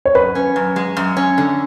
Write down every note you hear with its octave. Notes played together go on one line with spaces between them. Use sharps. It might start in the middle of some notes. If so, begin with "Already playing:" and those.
C#5
F#2 B4
C#4
F#2
G#3
F#2
C#4
D3